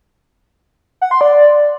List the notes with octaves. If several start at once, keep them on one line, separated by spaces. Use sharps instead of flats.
F#5
C6
D5